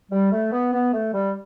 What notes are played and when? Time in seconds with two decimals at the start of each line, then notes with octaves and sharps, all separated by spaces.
0.11 G3
0.32 A3
0.52 B3
0.73 B3
0.94 A3
1.14 G3